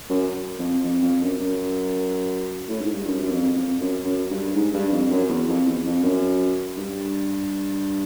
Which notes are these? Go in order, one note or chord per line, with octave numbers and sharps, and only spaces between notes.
F#2
F2
F2
F2
F#2
F#2
A2
G#2
G2
F#2
F#2
F2
F2
F#2
F#2
G2
G#2
G2
F2
F#2
E2
F2
E2
F2
F#2
G2